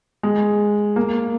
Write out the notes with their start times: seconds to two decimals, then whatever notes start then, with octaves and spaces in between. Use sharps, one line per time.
0.23 G#3
0.96 A#3